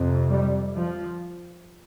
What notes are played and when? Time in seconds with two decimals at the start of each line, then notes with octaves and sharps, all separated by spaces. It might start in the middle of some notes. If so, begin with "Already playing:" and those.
Already playing: F2 C3
0.29 G3
0.75 F3